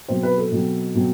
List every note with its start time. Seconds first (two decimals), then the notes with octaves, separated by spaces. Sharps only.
0.08 B2 F#3 C4 C5
0.23 B4
0.38 A4
0.51 B2 F#3 C4
0.95 B2 F#3 C4